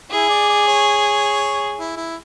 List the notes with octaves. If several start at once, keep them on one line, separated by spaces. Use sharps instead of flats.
E4 G#4
D5
D5
C#5
E4
E4